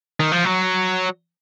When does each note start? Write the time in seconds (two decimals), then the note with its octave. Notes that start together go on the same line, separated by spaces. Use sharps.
0.20 D#3
0.32 F3
0.45 F#3